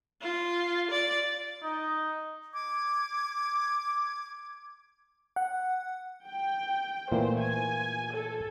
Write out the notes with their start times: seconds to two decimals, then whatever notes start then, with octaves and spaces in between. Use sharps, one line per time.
0.22 F4
0.91 D5
1.63 D#4
2.54 D6 G#6
5.36 F#5
6.28 G5
7.12 A#2 E3 A3 A#3 C5
7.40 G#5
8.14 A4